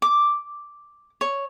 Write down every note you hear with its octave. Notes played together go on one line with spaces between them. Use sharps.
D6
C#5